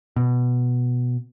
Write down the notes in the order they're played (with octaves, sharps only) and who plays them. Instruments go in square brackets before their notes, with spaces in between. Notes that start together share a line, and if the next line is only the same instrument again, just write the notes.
[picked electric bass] B2